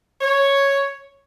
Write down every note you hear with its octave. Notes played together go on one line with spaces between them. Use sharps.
C#5